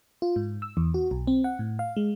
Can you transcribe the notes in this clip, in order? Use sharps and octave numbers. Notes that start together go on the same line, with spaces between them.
F4
G#2
E6
E2
F#4
B1
C4
F#5
A2
F5
G#3